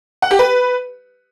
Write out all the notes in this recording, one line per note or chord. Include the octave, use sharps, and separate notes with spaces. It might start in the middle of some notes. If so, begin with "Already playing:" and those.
F#5
G4
B4